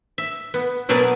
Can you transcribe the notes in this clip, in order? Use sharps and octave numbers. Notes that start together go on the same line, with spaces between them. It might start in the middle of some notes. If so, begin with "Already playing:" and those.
E5
B3
B2 F#3 B3 G#4 A#4 D5